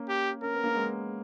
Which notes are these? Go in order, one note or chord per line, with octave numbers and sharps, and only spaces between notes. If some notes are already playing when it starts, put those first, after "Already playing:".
Already playing: A#3 C#4
G4
C#4 A#4
B3
A#3
G#3 B3